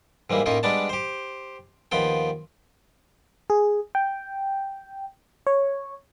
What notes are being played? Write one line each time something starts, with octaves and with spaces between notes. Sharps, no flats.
G#2 E3 G3 A#3
A2 A#3 C#4 D#4 F4
G3 G#3 B3 D4 D5 A5
G4 C5
D#2 F3 B3 F4 G5
G#4
G5
C#5